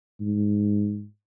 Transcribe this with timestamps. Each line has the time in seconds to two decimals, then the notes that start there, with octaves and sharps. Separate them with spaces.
0.20 G#2